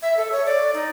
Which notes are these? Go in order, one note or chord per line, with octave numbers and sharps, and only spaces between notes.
E5
A4
C#5
D5
D#4